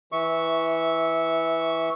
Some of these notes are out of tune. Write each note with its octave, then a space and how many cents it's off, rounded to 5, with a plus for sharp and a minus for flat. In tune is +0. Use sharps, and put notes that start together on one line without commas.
E3 +0 E5 -15 C#6 +0